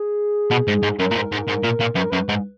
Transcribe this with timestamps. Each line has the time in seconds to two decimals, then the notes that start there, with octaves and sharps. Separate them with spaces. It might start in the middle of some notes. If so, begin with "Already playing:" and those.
Already playing: G#4
0.51 B2
0.68 G#2
0.83 G#2
0.99 F#2 A#4
1.11 A#2
1.15 G#2
1.32 G#2
1.48 G#2
1.64 A#2
1.80 A#2
1.96 F#2 B4
2.03 A#4
2.10 F#2 B4
2.29 G#2